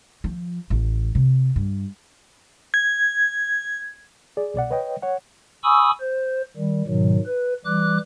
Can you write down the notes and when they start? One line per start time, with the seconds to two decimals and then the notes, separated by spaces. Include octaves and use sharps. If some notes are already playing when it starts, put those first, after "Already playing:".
0.24 F3
0.70 A1
1.15 C3
1.56 G2
2.74 G#6
4.37 G#4 D5
4.54 C2 B2 D5 F#5
4.71 B4 C#5 D#5 G5
5.02 C#5 F#5
5.64 G#5 B5 C#6 D#6 E6
6.00 C5
6.57 D#3 G3
6.87 G#2 B2 D#3 F#3
7.26 B4
7.65 E3 G3 D6 F#6